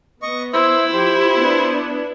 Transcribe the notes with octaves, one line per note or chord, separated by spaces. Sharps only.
B3 D#5 C#6
E4 C5 E5
F3 G4 C5 G5
B3 D4